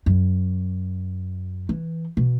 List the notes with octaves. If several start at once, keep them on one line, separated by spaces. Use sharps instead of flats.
F#2
E3
B2